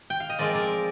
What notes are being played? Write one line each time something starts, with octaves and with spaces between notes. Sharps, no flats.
G5
F5
D#5
F3 G#3 C4 F4 A#4 D5
A#4 D5